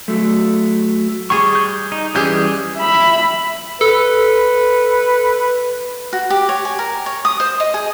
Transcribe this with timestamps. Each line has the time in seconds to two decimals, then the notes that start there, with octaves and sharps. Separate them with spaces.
0.08 F#3 A3
1.30 G3 G#4 C#6
1.55 G6
1.92 D#4
2.15 E3 G3 C#4 G4 G#4 G6
2.78 E5 B5
3.81 A4 B4
6.13 F#4
6.30 G4
6.49 C#5
6.65 G#5
6.79 A#4
7.06 C#5
7.25 D#6
7.40 C5
7.60 D#5
7.74 G#4